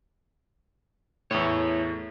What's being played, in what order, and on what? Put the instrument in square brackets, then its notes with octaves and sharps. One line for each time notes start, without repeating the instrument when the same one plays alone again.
[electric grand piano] E2 A2 [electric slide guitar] E4 C#5